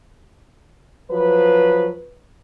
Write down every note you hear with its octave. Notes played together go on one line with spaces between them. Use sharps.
F3 F#3 B4